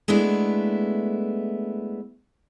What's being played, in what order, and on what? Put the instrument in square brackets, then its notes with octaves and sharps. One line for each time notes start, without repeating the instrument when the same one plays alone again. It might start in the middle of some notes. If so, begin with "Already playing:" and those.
[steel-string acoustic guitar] G#3 A3 B3 D4 E4